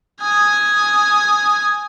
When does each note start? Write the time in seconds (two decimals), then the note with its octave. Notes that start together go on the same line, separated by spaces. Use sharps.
0.21 G#5 D#6